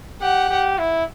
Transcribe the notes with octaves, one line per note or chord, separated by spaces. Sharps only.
G4 F#5
G4
E4